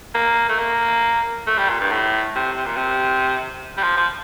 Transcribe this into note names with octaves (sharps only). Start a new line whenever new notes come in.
A#3
A3
A#3
A3
G3
A#2
G2
A2
C3
C3
A#2
C3
G3
F3
F3